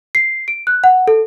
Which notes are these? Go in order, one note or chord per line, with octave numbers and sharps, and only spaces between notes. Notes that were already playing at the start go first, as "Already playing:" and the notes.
C7
D7
F#6
F#5
A4